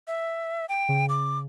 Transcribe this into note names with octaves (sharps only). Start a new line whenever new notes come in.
E5
G5
C#3
D6